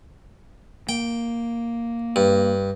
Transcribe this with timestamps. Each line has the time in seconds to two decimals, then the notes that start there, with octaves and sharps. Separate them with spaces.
0.89 A#3 G5
2.16 G2